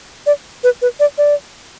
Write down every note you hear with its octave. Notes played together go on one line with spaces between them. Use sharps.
D5
B4
B4
D5
D5